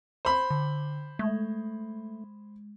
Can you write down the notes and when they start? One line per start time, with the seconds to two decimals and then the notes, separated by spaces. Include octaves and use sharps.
0.25 C5 B5
0.51 D3
1.19 G#3 A3